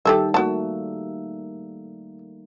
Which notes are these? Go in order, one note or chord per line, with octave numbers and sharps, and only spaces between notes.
D#3 G3 G4 A4 E5
A3 A#3 F#4 A5